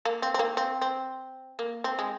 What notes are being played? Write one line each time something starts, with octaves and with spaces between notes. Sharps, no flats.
A#3
C4
C4
A#3
C4
C4
A#3
C4
G#3